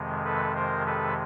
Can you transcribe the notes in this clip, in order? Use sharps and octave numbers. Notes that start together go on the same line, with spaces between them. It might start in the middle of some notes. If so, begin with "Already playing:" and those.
Already playing: F2 C3 D#3 G#3
A4 B4
A#4 C5
A4 B4